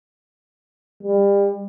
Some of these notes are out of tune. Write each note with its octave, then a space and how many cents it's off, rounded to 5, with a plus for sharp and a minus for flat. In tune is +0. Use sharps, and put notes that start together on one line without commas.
G3 +30